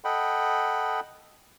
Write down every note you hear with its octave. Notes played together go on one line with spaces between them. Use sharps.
A4 D#5 F#5 G5 B5